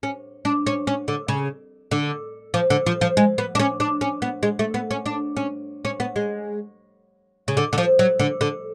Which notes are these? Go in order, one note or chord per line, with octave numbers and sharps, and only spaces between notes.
C#4
D4
C#4
C#4
D3
C#3
D3
F3
D3
F3
F3
G#3
B3
D4
C#4
D4
C#4
B3
G#3
A3
B3
C#4
D4
C#4
C#4
B3
G#3
C#3
D3
D3
F3
F#3
D3
D3